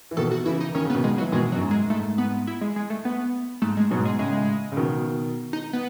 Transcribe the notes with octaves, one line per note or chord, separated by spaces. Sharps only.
E3
B2 D#3 A4
F#4
C#3 E3 E4
D#4
D#3 C#4
C#3 B3
B2 D#3
G#3
F#3
E3
B2 D#3 G#3
F#3
F#2
G#2
G#3
G#2 A3
B3
E4
G#3
G#3
A3
B3
G#2 A3
G#3
G#2 B2 F#3
G#3
A2 C#3 G#3
C#3
B2 D#3
D#4
B3